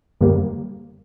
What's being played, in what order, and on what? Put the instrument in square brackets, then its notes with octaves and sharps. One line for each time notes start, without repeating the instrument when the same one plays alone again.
[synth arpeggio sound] F#2 D3 G3 A#3